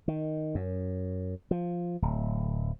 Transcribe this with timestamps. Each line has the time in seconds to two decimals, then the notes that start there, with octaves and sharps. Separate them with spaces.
0.08 D#3
0.55 F#2
1.51 F3
2.02 D1